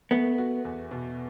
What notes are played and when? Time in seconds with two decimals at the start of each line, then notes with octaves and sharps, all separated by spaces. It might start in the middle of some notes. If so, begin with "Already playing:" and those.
0.11 A3 B3
0.38 F#4
0.65 E2
0.91 B2